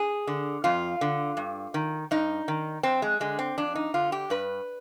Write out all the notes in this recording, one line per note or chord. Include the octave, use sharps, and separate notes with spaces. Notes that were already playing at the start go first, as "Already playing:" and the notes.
Already playing: G#4
D3
F2 F4
D3
G2
D#3
G2 D#4
D#3
F2 C4
G#3
D3 G#3
C4
F2 D4
D#4
D3 F4
G4
G2 B4